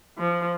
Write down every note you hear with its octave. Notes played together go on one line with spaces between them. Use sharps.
F3